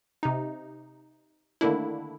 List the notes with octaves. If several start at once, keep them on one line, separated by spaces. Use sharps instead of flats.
C3 D#4
D3 D#3 A3 A#3 D4 E4